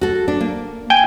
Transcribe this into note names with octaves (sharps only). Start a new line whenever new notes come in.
F#4 A4
D4
A#3
G5 G#5